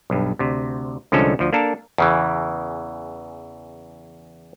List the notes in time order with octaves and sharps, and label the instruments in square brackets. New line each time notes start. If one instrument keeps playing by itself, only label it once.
[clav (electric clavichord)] B1 G2
D2 C3
C2 D3 F3 G#3 C#4 A4
D2 F3
A#3 D4 A4 A#4 A5
E2 C#3 E3